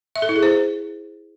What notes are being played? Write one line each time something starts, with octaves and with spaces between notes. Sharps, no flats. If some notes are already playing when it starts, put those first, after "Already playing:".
E5
A4
E4
G#4
C5